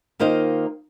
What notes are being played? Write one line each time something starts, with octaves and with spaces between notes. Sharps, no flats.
D#3 A#3 F4 C5 D#5 F5